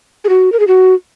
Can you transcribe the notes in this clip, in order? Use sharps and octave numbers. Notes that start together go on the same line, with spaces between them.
G#4
F#4
A#4
G#4
F#4